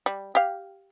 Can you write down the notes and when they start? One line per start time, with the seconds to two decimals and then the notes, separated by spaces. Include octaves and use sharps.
0.06 G3
0.35 G4 F5